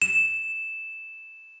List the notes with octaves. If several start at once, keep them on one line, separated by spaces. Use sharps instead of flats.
E7